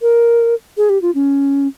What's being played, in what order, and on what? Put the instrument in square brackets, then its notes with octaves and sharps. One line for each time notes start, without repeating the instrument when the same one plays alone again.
[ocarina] A#4
G#4
G4
F4
C#4